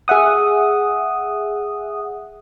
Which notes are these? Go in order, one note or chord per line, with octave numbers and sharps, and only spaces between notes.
G#4 E5 F#5 D#6